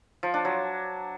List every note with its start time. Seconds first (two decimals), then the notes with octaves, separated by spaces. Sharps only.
0.23 F3
0.34 D4
0.45 F#3